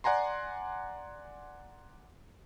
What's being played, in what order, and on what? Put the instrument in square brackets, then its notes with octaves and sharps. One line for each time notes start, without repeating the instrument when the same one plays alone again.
[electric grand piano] D5 F#5 G#5 A#5 C6